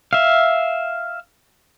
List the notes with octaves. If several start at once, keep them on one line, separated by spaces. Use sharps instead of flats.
E5 F5